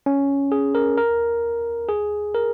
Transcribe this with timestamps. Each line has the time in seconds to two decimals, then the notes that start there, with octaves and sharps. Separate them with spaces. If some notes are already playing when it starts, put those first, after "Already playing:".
0.06 C#4
0.52 G#4
0.75 A#4
0.98 A#4
1.89 G#4
2.34 A#4